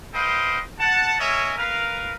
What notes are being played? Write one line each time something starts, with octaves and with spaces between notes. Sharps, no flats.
A4 B4 C5 D#5 F5 G5
F#5 A5
A#4 C#5 D#5 E5 G#5
A#4 B4 F5